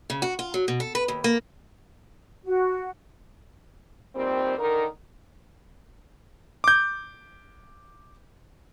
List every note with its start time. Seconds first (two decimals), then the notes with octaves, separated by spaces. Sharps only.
0.10 C#3
0.22 F#4
0.39 F4
0.54 F#3
0.68 B2
0.80 A4
0.95 B4
1.08 D#2
1.24 A#3
2.45 F#4
4.15 A#2 D#3 G3 C4
4.58 D3 D#3 D#4 A#4
6.64 D6 G6